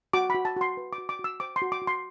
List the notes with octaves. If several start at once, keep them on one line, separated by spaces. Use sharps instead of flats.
F#4 D6
F#4 B5
A5
F#4 C6
B4
D6
F#4
D6
F#4
E6
C5 D6
C6
F#4
D6
F#4
C6